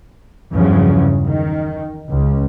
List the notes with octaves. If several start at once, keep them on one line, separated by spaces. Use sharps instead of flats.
E2 G2 C#3 F3 F#3
D#3
C#2